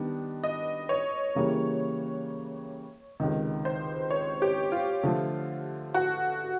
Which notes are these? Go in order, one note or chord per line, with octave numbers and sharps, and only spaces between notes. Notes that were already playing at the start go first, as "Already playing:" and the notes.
Already playing: D#3 G3 B3 D4
D#5
C#5
C#3 E3 G3 A#3
C#2 C3 D#3
C5
C#5
G4
F4
D3 F3 A3
F#4